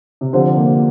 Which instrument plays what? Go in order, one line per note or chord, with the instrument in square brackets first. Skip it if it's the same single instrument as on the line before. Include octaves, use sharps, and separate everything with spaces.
[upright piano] C3
[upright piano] D3 [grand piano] F3 C4 G4 C5
[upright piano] A#3